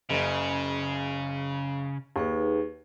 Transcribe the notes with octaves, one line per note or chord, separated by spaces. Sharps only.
F#1 C#3
D#2 D#4 G#4 B4